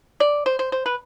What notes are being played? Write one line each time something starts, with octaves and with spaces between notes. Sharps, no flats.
D5
C5
C5
C5
B4